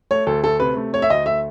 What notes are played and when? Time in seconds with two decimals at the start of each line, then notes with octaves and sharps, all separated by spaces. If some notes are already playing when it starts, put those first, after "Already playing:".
0.11 A3 C#5
0.27 D2 A4
0.44 A3 A4
0.60 C3 B4
0.77 A3
0.93 A3 C#5
1.02 E5
1.10 D2 D#5
1.26 A3 E5